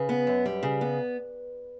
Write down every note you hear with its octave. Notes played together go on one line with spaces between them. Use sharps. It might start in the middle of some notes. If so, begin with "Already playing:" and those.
Already playing: C#3 B4
B3
F#2
G3
C#3
B3